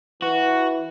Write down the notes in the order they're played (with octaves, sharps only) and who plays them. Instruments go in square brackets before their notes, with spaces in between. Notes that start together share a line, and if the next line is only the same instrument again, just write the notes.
[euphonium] E3 [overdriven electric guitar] F#4